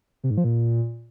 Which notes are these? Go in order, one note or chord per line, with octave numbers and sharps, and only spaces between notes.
C3
G#2
F3
A#2